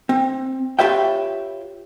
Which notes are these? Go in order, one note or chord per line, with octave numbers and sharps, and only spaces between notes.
C4
F4 G4 B4 C#5 E5 G5